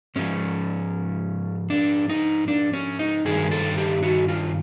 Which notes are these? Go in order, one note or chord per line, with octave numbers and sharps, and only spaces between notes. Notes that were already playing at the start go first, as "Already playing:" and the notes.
G#2 F3 C#4
D4
D#4
D4
C#4
D#4
G2 D#3 G#4
A4
G4
F#4
F4